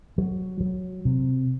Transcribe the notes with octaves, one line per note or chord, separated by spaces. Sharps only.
F#3
F#3
C3